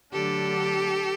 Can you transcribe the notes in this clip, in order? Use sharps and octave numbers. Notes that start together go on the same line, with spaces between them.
D3 F#3 A3 D4 G4 A4